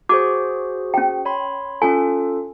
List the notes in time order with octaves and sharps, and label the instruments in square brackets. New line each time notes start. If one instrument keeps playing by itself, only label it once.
[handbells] F#4 G#4 C5 [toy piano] D6
[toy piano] C#4 G5
[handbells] C#5 B5 C6
[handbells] C#4 F4 A4 [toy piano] G#5